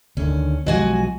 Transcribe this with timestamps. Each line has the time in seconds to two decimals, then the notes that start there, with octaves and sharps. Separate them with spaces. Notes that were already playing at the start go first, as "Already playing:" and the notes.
0.17 D2 D3 D#3 C#4
0.66 B1 F3 G#3 F#4 G#5